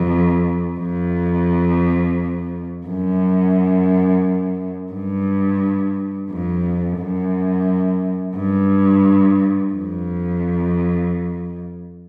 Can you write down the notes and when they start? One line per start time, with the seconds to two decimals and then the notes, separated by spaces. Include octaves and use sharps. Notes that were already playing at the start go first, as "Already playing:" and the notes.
Already playing: F2
0.79 F2
2.86 F#2
4.92 G2
6.30 F2
6.99 F#2
8.36 G2
9.73 F2